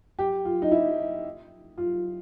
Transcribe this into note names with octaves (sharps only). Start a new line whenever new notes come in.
G4
F4
D#4
E4
F4